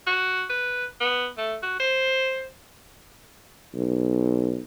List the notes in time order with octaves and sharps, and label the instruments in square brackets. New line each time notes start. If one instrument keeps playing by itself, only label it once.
[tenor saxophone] F#4
B4
B3
A3
F#4
C5
[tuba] B1